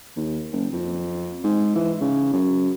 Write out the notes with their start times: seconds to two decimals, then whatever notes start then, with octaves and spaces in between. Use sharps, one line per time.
0.17 D#2
0.52 F#1
0.72 F2
1.44 G#2
1.76 E3
2.01 C#3
2.33 F#2